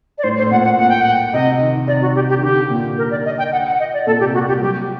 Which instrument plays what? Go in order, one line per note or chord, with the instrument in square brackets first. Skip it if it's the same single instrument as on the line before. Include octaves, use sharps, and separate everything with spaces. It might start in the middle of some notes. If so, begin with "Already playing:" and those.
[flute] D5
[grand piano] A2 [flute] C5
[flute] C5
[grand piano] A2
[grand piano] A#2 [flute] F#5
[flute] F#5
[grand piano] A#2 [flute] F#5
[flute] G5
F#5
[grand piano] C3 [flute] D#5
[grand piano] D#3
D#3
[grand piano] C3 [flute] D5
[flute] F#4
G4
G4
[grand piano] D#3
[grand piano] D3 [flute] G4
[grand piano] A#2
[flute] A#4
D5
D#5
G5
F#5
F#5
D#5
D5
[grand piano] A#2 [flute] A4
[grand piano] C3 [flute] G4
[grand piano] A#2 [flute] F#4
[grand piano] G3 [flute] G4
[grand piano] F#3 [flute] G4